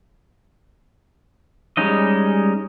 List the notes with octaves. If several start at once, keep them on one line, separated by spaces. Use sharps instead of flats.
G3 G#3 C#4 D#4 D#5